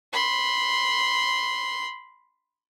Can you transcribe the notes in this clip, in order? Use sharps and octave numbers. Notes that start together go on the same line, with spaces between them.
B5 C6